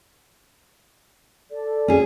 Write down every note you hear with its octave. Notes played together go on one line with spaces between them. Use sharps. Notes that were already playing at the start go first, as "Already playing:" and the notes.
A4 D5
C#4 G#4